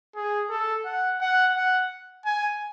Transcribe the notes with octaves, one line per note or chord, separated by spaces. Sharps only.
G#4
A4
F#5
F#5
F#5
G#5